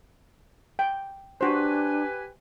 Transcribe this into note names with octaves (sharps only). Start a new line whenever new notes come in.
G5
D4 F#4 G4 B4 C5 G#5